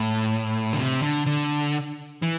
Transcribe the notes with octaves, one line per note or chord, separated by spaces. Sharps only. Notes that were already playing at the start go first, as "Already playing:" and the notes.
Already playing: A2
D3
C3
D3
D3
E3